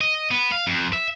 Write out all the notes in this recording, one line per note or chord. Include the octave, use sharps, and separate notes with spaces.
D#5
B3
F5
F2
E5